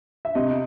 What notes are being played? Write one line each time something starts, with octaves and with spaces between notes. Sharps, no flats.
E5
C3 D#5